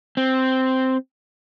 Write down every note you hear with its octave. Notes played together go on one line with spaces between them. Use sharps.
C4